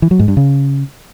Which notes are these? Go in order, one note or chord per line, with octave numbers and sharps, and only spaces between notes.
E3
F#3
G#2
G2
C#3